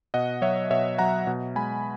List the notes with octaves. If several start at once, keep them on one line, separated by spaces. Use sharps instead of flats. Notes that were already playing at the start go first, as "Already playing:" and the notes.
B2 D#5 F#5
F#3 C#5 E5
B2 C#5 E5
F#3 F#5 A#5
B2
G#3 G#5 B5